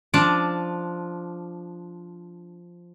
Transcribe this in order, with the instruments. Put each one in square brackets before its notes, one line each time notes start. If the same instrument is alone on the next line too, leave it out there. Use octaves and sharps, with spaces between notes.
[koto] F3 D4 D5